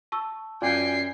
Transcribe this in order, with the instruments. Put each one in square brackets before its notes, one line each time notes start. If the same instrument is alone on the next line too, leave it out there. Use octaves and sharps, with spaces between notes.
[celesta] A5 C#6 E6
[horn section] F#2 G#5 [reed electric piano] F4 D5 [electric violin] G5 C7